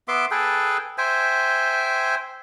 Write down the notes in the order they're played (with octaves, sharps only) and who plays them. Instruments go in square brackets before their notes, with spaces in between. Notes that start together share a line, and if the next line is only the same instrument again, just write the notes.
[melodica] B3 E5 C6 D6
G#4 A4 B4 G5
C5 E5 G5 G#5